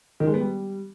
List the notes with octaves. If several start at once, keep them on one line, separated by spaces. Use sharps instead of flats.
D#3
G#3
B3
G3